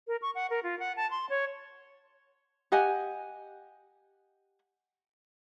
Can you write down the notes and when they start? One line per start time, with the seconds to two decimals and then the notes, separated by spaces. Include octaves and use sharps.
0.08 A#4
0.22 C#6
0.35 F#5
0.50 A#4
0.63 F4
0.79 F#5
0.97 A5
1.11 C6
1.30 C#5
2.72 G4 D#5 F#5 G#5